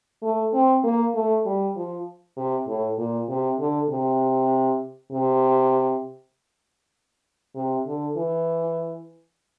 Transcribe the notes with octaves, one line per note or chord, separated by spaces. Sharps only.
A3
C4
A#3
A3
G3
F3
C3
A2
A#2
C3
D3
C3
C3
C3
D3
E3